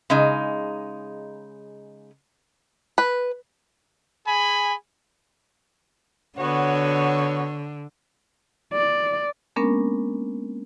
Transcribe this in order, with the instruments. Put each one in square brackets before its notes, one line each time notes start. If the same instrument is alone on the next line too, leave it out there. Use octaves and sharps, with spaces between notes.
[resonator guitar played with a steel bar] C#3 G#3 D#4
[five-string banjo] B4
[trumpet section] G#4 G#5 B5
[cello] D3 [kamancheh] B3 F#4 [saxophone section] C#5
[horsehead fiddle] D5
[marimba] G#3 A#3 B3 C#4 D4 A#4